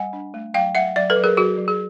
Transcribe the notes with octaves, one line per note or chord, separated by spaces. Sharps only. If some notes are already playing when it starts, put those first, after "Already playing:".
Already playing: G3 F#5 G#5
D4
A3
F#3 F5 G5
F#3 E5 F#5
F#3 D5 E5
A4 B4
F#3
G#4 A#4
F#3 F#4 G#4
F#3
G#4